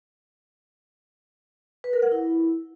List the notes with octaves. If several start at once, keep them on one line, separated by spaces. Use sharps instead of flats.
B4
A#4
F#5
E4